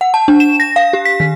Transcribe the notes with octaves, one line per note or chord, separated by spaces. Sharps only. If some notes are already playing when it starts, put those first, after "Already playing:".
F#5
A5
D4
E7
A#6
F5
G4
B6
D#3